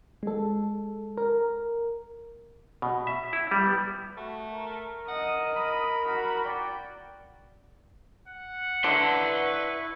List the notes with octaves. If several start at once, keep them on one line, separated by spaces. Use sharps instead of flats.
G#3 A4
A#4
B2
E5
E4
G3
B3
A3 F#4
A#4
D#5 F#5
B5
F#4
D5 G5
F#5
D3 E4 B4 C6 C#6